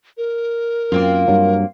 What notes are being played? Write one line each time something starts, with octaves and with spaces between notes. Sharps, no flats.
A#4
F#2 A#3 C4 F4
G2 F#3